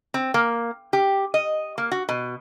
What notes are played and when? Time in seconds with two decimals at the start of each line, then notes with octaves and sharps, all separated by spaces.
0.14 C4
0.34 A#3
0.93 G4
1.34 D#5
1.78 A#3
1.92 F#4
2.09 B2